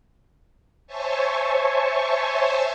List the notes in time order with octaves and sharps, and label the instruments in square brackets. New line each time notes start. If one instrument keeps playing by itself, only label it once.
[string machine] C5 C#5 E5 G#5 A5 C#6